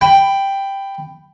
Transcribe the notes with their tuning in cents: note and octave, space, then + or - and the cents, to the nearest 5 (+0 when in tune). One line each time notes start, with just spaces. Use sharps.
G5 +0 B5 +15